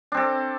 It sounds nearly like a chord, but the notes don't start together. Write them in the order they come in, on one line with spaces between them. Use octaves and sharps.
D4 C4 A4